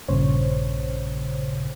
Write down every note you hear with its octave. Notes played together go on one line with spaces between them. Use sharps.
A#1 G2 A#2 C#3 C5 C#5